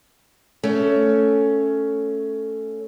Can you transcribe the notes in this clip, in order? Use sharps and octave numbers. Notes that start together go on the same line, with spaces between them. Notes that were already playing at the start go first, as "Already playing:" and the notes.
A3 C#4